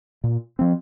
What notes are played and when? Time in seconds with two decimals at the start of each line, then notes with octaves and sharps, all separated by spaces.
0.24 A#2
0.59 F3 C4